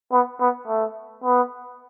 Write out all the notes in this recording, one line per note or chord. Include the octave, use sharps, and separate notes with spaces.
B3
B3
A3
B3